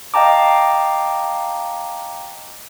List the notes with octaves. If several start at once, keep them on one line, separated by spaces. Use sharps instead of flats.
D#5 F5 G5 A5 A#5 D6